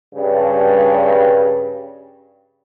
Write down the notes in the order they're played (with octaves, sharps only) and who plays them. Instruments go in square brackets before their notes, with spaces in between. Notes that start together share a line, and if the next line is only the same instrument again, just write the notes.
[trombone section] G2 C#3